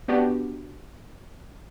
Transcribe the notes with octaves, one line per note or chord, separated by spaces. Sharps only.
B3 D4 F#4 G4